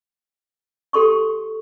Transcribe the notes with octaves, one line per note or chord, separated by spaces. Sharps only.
G4 A4 C6 C#6